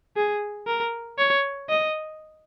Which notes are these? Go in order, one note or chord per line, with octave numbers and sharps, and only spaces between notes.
G#4
A#4
C#5
D#5